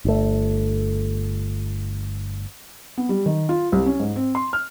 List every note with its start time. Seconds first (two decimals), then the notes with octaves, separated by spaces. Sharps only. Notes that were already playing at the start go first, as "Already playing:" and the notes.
0.05 G1 A3
2.97 B3
3.09 G3
3.26 D#3
3.49 F4
3.72 C2
3.86 C#4
4.00 G#2
4.16 C4
4.35 C6
4.53 F6